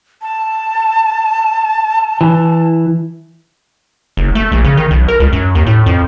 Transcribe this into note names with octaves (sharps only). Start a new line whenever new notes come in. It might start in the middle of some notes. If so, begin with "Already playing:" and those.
A5
E3
F#1
A3
A#1
C#3
D#3
B1
A#4
C#2
F#2
D#2
A2
F2